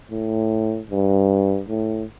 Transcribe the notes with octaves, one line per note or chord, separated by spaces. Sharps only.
A2
G2
A2